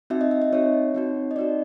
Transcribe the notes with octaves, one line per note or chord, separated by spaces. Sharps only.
C4 D#4 F#4 E5
D#5
E5
D#5
C4 D#4 F#4 C#5
C4 D#4 F#4
D#5
C4 D#4 F#4 D5